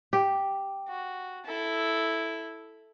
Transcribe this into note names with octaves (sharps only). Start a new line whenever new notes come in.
G4
F#4
E4 A4